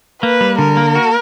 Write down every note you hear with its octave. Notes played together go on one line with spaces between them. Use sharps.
A#3 B4
G3
D3 A#4
A#3
F#4